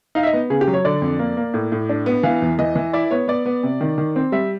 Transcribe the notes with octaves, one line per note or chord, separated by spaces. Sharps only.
D#4 F5
E5
D#5
B3
C#3 G#4
G4
F#3
C#5
D3 D5
F2
A#3
A#3
A2
A2
D4
B3
E3 F5
E2
E3 D#5
E3
E4 D5
B3 C#5
B3 D5
B3
C3
D#3
D#3
C4
G3 E5